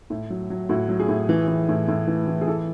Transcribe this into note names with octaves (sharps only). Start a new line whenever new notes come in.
A2
F#3
F#3
A2 F#4
F#3
G#4
A2
E3
E3
A2
A2
E3
E3
G#4
E3 A4